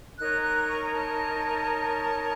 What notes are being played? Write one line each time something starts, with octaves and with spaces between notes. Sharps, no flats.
D#4 A#4 C#5 F#6
F#6
C#6
A5